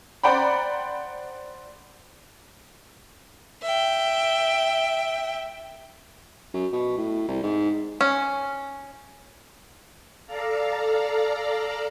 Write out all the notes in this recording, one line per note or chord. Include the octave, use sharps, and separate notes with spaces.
C5 D5 F#5 G5 A#5 B5
E5 G5
F#2
B2
A2
C2
G#2
C#4
A4 D5 F5 A#5